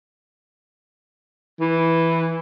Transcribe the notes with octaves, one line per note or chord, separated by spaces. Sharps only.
E3